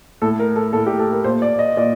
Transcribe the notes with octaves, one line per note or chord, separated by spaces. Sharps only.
A2 A4
A#4
A4
A2 A4
G4
A4
A#4
A#2 C5
D5
D#5
A#2 D5